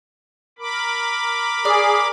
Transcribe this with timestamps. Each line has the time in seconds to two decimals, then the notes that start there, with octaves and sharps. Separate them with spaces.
0.59 A#4 B5 D6
1.65 G#4 D5